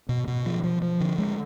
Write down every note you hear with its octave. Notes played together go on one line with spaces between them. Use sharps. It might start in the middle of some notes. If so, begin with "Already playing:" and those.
B2
B2
F3
F3
F3
D3
G#3